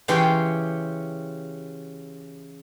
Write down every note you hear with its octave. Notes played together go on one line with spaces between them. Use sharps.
C#3 E3 C#4 G4 G5 C6